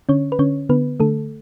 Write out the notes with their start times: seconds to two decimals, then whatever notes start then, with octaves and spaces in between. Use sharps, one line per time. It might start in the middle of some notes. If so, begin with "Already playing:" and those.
0.09 D3 C#4 C#5
0.32 B4
0.39 D3 C#4 C#5
0.69 D3 B3 B4
1.00 D3 A3 A4